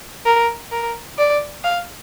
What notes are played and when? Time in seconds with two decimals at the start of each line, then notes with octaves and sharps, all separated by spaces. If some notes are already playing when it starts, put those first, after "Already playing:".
0.25 A#4
0.72 A#4
1.18 D5
1.64 F5